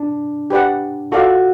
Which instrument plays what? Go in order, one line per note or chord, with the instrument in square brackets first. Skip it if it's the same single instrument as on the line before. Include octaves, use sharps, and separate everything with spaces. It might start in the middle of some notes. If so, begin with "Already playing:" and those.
Already playing: [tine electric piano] D4
[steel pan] G4 B4 D5 F#5
[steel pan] F4 A4 D5 F5 [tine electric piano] F#4